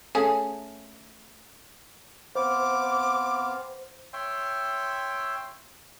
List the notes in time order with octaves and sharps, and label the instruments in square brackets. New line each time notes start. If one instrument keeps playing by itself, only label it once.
[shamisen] A3 C#4 G#4
[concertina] B3 C4 F5 [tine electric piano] C5 [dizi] D6
[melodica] C#5 E5 G5 C6